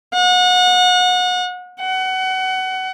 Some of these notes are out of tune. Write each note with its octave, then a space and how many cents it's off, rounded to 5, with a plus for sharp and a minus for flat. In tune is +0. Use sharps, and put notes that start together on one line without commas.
F#5 -30
F#5 +25